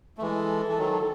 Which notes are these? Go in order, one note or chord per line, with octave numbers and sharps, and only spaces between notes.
A3
E3 G#3 A4
E3
D#3 F#3